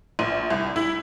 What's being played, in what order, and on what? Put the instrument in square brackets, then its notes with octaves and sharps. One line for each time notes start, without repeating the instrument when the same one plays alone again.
[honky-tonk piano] A#1
C2
E4